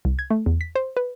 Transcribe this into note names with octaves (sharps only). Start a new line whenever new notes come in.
C2
G#6
A3
E2
B6
C5
B4